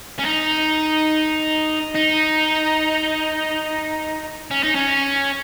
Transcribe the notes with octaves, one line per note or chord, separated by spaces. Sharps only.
C#4
D#4
D#4
C#4
D#4
C#4